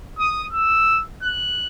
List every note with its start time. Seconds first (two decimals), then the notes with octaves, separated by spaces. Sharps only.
0.18 D#6
0.53 E6
1.23 F#6